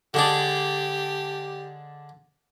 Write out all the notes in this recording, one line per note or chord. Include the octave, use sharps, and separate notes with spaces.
D3 G#3 D4 G4